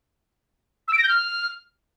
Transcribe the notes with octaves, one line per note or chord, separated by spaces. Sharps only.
E6
D7
A#6
G6
F6